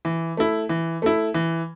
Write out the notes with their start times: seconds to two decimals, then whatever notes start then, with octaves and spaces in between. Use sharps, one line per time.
0.05 E3
0.37 A3 E4
0.69 E3
1.02 A3 E4
1.34 E3